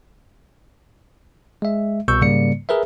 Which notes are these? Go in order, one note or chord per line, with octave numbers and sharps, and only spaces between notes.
G#3 E5
C2 B2 C#6 E6 G6
G#2 C#3 G3 A#3 D5 C#7
G#4 A#4 B4 E5